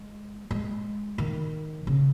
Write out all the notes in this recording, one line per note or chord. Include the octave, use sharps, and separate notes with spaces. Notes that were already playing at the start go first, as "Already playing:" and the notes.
Already playing: G#3
G#3
D#3
C#3